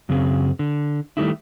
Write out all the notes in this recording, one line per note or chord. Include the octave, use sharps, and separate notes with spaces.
F#2 C#3 C4 G#4
D3
D#3 G3 A3 D#4 E4